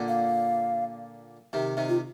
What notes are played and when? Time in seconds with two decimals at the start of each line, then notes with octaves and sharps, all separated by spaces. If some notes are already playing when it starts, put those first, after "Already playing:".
Already playing: A#2 D3
0.08 F5
1.53 C3 D#3
1.77 C3 D#3
1.89 F4